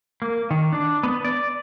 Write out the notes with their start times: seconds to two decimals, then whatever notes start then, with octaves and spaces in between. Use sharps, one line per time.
0.22 A#3
0.51 D#3
0.73 D4
1.03 B3
1.25 D5